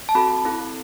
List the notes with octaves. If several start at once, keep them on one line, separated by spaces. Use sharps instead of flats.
A5
C4 F#4 A4 B5
C4 E4 A4